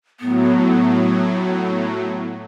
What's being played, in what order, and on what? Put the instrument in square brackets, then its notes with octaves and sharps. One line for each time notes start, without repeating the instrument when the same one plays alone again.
[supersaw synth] A2 F#3 [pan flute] B3